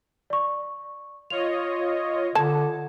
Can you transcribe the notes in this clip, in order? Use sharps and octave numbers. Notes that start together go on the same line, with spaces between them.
D5 C#6
F4 C#5 D#5 F7
D3 F4 A4 A5 G#6